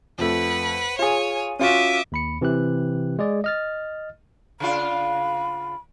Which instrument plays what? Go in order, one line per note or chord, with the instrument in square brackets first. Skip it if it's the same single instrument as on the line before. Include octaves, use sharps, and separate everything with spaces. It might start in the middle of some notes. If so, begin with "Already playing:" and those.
[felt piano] F2 A3 [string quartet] B4 F#5
[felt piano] F4 G#4 [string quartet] C#5 G#5
[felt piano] C#4 F4 F#4 [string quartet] E5 D6 D#6
[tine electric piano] D#2 B5 C#7
C3 E3 C4 G4 F#6
G#3 G#4 D5
D#5 F6 A6
[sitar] C#3 D4 F4 [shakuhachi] B5